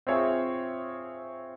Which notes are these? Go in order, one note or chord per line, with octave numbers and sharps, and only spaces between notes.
C4 F4 G#4 C#5 E5